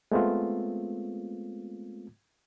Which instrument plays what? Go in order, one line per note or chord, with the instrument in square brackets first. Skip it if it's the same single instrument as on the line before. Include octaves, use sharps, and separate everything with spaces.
[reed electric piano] G#3 A3 B3 C4 F4